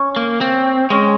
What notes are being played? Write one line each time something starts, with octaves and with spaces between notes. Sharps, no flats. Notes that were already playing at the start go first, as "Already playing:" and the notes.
Already playing: C#4
A#3
C4
G#3 C#4